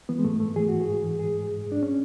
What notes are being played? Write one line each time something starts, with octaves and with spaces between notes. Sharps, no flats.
E3 B3
G#3
G#2 A3
G#2 A3
E3 G#4
G#2 F#4
G#4
G#2
E3
G#2 G#4
G#2
G#2
G#2
D4
C#4